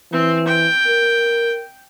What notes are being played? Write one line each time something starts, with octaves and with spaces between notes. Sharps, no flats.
E3 C4
G5
A#4